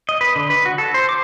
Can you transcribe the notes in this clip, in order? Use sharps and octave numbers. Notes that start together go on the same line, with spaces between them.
D#5
B4
D3
B4
F#4
A4
C5
D6